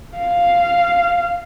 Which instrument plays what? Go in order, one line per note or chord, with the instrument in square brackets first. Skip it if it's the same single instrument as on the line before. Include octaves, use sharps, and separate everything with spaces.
[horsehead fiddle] F5